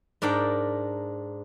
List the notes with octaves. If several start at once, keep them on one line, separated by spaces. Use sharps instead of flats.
G#2 D4 A#4 G5